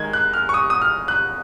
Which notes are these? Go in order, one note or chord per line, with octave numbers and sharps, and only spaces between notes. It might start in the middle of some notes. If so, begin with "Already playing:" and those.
Already playing: D#3 G#3 G#6
F#6
F6
C#6
D#6
D#6
F6
F#6